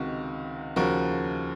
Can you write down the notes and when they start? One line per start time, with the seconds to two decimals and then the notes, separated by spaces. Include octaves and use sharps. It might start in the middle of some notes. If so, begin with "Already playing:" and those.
Already playing: C#2 C3 D#3 F#4
0.76 D#2 C#3 F3 F#4 A#4